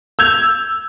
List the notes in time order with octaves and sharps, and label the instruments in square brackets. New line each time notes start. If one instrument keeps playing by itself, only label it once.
[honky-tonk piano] E6 G6 G#6 F7